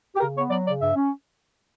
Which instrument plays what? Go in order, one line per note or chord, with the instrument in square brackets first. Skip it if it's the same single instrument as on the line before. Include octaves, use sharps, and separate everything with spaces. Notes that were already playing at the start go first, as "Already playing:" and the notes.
[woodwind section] G4
C#3 A#4
B3 C#5
F#3 D5
C#3 D5
G2 E5
C#4